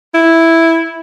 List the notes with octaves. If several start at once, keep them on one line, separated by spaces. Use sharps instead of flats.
E4